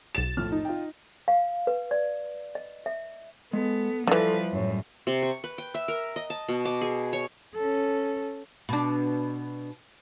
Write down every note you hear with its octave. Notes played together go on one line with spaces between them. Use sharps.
B1 A6 E7
F2 A2 F6
D#4
F4 G5
F5
B4
D5
D#5
E5
G#3 B3 A4
D3 E3 F3 G3 A4 B4 D5 E5
F#2 A2 C#5
C3
C#6
B4
G5
E5
A#4
D#5
A5
B2
D6
G#4
C#5
C#4 A4
B2 D4